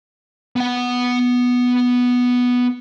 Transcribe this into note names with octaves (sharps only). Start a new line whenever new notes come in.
B3 F#5